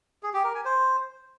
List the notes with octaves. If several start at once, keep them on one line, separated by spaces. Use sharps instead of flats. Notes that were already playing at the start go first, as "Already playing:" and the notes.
G#4
G4
A#4
G#5
C5